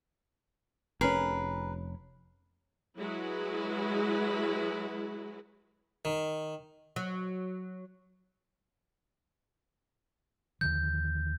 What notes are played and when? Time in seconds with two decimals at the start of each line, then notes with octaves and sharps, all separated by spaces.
1.01 F1 C#4 G#4 A#4 B4
2.97 F#3 G#3 E4 F#4 G#4 B4
6.05 D#3
6.96 F#3
10.61 D#2 D3 F3 G6